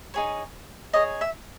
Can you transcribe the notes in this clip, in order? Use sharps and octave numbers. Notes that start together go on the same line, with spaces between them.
D#4 G#4 C#5
D#4 G#4 C#5 D#5
E5